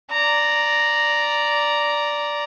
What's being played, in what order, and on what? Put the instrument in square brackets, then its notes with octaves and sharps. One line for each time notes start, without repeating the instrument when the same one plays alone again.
[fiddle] D5 A#5